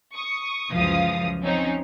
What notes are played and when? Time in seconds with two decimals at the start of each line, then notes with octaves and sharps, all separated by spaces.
0.16 C#6 D#6
0.72 C#2 F#2 E3 F3 F5 D#6
1.43 F3 C4 C#4 D#4